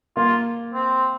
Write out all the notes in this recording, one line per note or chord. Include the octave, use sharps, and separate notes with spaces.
A#3 F4
C4